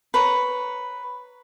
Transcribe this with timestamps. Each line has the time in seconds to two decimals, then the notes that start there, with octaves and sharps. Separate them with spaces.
0.14 B4 C#5 A#5